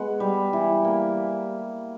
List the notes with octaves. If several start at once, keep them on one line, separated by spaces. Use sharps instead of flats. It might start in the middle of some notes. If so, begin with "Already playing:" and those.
Already playing: G#3 B3 F#4
G3
E3
A#3